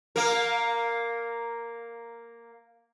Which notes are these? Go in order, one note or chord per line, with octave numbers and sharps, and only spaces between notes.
A#3 A#4